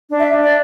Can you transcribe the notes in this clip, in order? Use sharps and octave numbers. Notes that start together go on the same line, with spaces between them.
D4
E5
D4
D5